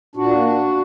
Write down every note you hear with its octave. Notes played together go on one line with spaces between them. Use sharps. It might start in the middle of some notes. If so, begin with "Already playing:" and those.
A#2 D4 F#4
A#3